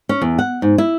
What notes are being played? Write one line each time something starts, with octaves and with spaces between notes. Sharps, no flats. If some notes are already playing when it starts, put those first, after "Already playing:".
C#4
E2
F#5
G#2
E4